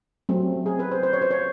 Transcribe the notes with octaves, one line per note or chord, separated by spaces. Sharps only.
F#3 A3 C4
G#4
B4
C5
C5
C#5
C5
C#5